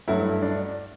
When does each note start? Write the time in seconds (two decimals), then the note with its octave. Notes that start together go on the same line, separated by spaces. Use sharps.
0.08 G2 F#3 A3 E4
0.42 D4